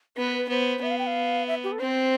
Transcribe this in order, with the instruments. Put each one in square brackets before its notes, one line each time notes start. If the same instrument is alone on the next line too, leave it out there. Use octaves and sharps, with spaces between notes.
[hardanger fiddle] B3 [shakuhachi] B4
[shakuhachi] B4
[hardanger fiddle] B3 [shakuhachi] C5
[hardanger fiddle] B3 [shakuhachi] E5
[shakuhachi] F5
G5
F5
E5
G4
A4
[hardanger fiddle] C4 [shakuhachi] C5